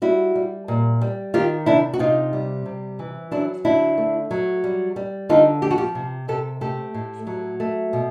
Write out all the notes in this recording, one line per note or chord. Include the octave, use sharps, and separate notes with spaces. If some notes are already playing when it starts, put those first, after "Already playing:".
G3 E4 F#4
G3
A#2
G3
D#3 F4 G4
C3 D4 E4
F#4
C3 D#4 F4
G3
C3
E3
F#3 D4 E4
D3 D4 E4
A3
F#3
G3
G3
D3 D#4 F4
F3 G4
F#4
F4 G4
C3
C3 G4 A4
A3 G4 A4
A2
F#3
A3
B2